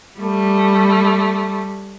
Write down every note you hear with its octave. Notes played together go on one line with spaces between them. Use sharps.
G3 A3